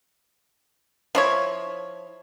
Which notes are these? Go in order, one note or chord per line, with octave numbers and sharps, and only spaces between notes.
F3 E4 C#5